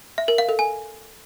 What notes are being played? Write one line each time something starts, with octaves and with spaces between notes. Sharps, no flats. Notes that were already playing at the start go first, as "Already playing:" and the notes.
E5
A#4
F5
A4
G#5